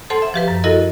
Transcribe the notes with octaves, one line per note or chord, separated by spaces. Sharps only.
A4 C5 F#5 A5 C6
E5
F3 G4 B4
F#2
E4 F#4 A4 A#4 D#5